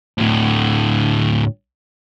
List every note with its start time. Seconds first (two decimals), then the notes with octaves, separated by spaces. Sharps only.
0.18 D2 A2